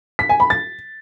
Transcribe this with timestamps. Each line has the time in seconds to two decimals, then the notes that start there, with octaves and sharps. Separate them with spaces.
0.19 B6
0.29 G#5
0.40 B5
0.50 A6